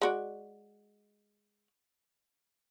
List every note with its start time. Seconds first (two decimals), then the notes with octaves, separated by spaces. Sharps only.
0.02 G#3 F#4 D5